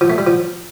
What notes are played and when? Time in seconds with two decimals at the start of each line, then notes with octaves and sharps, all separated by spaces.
0.01 F3
0.10 A3
0.18 G3
0.27 F3